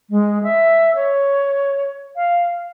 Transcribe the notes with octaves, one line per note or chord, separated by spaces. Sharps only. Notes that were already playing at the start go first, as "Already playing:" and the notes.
G#3
E5
C#5
F5